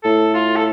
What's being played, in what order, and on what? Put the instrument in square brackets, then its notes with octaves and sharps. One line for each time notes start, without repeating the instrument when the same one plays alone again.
[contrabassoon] A2 [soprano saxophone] A4
[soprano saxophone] F4
A4